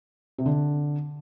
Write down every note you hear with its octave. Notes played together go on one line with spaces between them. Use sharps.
C3
D3